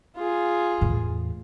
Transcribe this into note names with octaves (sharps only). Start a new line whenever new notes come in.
F4 G#4
E2 A2